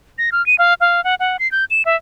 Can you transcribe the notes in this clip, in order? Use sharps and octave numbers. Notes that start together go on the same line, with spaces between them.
A#6
F6
D#7
F5
F5
F#5
F#5
C7
G6
E7
E5